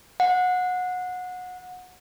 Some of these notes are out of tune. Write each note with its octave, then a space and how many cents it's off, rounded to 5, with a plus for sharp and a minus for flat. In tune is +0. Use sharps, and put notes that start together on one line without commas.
F#5 -25